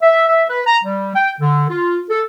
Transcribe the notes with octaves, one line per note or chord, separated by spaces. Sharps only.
E5
E5
B4
A#5
G3
G5
D3
F4
A4